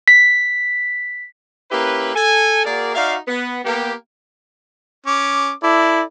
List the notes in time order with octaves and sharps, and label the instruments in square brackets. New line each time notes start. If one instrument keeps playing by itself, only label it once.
[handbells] B6
[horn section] A#3 C#4 E4 G4 B4
A4 G#5
A#3 F#4 G#4 A#4 D5
D#4 F#4 D5 E5 F5
B3
A#3 B3 G4
[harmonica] C#4 D6
[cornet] E4 [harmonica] A4 D5